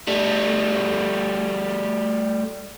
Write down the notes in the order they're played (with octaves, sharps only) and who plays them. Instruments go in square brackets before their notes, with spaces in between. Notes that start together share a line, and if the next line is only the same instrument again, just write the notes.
[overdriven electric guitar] G3 A3